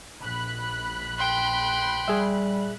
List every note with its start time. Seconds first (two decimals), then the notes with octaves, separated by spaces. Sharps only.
0.22 A#1 B5 F#6
1.18 G5 C6
2.08 G3 G#4 E5